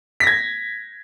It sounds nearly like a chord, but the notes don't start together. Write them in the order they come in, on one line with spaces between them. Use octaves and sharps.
B6 A#6 G#6